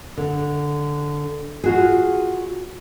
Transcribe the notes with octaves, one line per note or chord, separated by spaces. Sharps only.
D3
F4 F#4 G#4